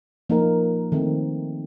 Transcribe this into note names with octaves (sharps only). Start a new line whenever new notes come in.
F3 A#3 D#4 A#4
D#3 A3 C4